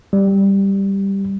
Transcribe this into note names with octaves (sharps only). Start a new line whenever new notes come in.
G3